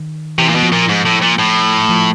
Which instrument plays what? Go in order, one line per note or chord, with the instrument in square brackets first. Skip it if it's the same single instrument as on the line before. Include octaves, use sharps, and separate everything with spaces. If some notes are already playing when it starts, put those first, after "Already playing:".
Already playing: [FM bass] D#3
[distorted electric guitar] C3 [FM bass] E3
[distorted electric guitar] A#2
B2
[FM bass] F3
[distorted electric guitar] A#2
G#2
A2
A#2
A2
[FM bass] F3